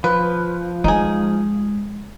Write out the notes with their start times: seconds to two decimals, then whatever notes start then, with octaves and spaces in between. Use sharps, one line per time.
0.04 F3 B4
0.84 G#3 D#4 G#4